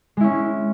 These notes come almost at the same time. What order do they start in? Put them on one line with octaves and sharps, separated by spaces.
G#3 E4 C#4